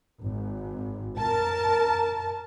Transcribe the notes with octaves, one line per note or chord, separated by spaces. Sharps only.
G#1
A#4 A5